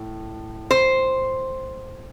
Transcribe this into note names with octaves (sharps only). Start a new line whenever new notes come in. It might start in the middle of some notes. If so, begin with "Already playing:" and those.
Already playing: A2
C5